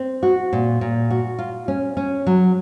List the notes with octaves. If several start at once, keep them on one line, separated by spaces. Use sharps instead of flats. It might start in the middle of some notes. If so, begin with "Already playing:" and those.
Already playing: C4
F#4
A#2
A#2
F#4
F4
C#4
C#4
F#3